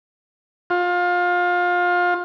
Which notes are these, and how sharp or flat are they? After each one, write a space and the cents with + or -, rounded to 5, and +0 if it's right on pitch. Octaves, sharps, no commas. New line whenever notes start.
F4 +25